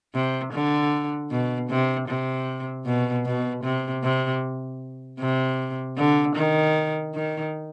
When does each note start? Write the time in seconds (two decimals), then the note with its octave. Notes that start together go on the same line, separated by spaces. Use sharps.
0.14 C3
0.53 D3
1.31 B2
1.70 C3
2.09 C3
2.86 B2
3.25 B2
3.64 C3
4.04 C3
5.20 C3
5.98 D3
6.36 D#3
7.15 D#3